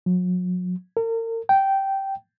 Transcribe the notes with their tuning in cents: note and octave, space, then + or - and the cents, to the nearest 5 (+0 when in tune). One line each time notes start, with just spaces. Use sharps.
F#3 -40
A#4 -40
G5 -10